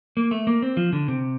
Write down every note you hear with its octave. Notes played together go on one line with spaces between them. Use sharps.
A#3
A3
A#3
C4
F3
D3
C3